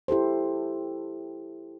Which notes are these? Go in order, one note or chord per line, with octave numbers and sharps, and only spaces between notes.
E4 G4 A4 C5